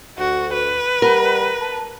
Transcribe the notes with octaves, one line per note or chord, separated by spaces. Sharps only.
D2 F#4
B4
G3 A#4 F#5 B5
A5